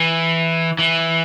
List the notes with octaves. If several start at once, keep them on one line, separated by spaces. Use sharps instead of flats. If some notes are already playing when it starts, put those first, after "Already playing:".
Already playing: E3
E3